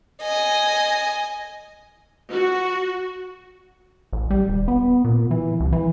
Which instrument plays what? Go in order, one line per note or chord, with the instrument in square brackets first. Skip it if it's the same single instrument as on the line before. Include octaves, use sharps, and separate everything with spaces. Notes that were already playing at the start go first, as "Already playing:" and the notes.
[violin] D#5 G#5
[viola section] F#4
[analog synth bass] A1
G3
D#1
B3
A#2
E3
C2
E3